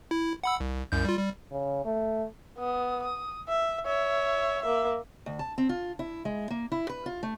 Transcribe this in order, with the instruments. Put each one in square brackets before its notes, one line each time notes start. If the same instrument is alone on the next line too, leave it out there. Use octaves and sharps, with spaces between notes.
[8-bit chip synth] E4
F#5 B5 E6
C2
C2 F#2 G6
G3 F4
G3
[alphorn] C#3
A3
[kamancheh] B3 D#6
D#6
E5
C#5 E5
A#3 E5
[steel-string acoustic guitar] D2
A5
C4
F4
E4
G#3
A#3
E4
B4
F4
A3